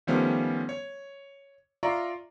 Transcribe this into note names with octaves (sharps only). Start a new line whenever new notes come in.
D#3 F3 G3 A3 B3 C#4
C#5
F4 D5 E5 A#5 C6 C#6